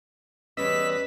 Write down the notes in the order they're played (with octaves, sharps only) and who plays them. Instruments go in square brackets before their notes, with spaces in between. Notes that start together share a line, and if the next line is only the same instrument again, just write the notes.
[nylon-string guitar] E2 G3 C#4 [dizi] B4 [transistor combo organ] D#5 E6 [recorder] B6